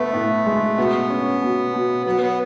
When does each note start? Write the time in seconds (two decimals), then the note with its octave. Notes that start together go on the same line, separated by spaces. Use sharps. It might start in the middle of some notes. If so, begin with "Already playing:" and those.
Already playing: A3 B3
0.14 A2
0.46 G#3
0.77 B2 B3
1.10 C#4
1.42 B2
1.74 B2
2.06 F#3 B3
2.22 B3